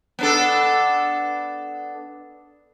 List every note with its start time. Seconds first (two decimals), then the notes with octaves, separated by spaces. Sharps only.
0.19 B3 D4 A4